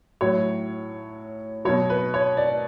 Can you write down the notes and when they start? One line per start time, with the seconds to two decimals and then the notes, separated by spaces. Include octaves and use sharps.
0.21 A2 F#3 C#5
1.65 B2 F#3 C#5
1.90 B4
2.14 C#5
2.37 D5